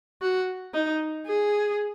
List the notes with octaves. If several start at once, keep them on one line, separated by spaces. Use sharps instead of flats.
F#4
D#4
G#4